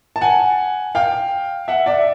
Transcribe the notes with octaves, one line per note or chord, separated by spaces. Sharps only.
A5
F#5 G#5
F5 G5
E5 F#5
D5 E5